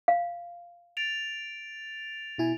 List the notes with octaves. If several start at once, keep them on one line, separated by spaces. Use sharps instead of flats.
F5
A6 D7 F7
B2 E4 G#5